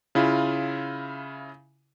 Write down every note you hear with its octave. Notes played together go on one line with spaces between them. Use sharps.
C#3 E4 F4